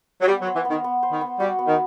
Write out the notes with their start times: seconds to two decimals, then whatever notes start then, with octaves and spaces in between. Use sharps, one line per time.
0.22 F#3
0.28 G3 B3
0.42 F#3
0.47 C5
0.56 E3
0.65 B3
0.70 D#3
0.84 B3
1.03 C5
1.12 D#3
1.21 B3
1.40 G3 F#4
1.59 B3
1.67 D#3